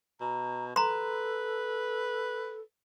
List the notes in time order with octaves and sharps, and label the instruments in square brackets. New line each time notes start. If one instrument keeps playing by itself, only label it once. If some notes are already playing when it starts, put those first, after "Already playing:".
[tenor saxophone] B2 [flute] A#5
[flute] A4 [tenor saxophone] B4 [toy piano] A#5 C6